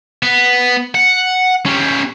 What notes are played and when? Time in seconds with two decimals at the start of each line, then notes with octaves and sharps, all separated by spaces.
0.23 B3
0.95 F#5
1.66 C#4 G4